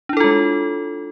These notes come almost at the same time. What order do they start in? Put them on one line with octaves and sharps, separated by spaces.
D4 E4 A4 F4 G#3